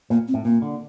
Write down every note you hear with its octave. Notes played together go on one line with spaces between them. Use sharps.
A#2 A#3
C4
A2
A#2 A#3
D3